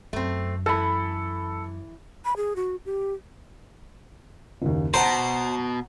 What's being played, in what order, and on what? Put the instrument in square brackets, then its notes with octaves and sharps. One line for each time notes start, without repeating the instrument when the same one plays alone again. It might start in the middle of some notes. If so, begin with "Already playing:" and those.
[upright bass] F#2 [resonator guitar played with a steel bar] A3 C4
[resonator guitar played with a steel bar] E3 E4 [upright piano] A4 B5
[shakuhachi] B5
G#4
F#4
G4
[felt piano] F#1 D#2
[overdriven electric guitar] B2 [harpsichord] C5 [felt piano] F#5 A5 A#5